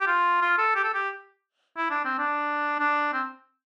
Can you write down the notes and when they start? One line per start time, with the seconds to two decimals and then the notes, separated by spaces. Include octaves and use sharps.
0.01 G4
0.07 F4
0.42 F4
0.58 A4
0.76 G4
0.84 A4
0.94 G4
1.77 E4
1.91 D4
2.05 C4
2.18 D4
2.80 D4
3.13 C4